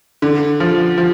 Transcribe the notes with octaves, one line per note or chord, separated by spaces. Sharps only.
D3
F3
F3